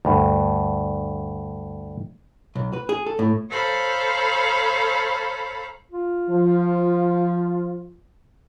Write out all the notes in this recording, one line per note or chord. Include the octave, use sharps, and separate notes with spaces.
D2 G2
B1
B4
G#4
A4
A2
A4 C5 C#5 F5 A#5 B5
F4
F3